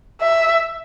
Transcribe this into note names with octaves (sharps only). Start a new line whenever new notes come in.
E5